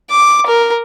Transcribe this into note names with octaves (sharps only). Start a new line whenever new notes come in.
D6
A#4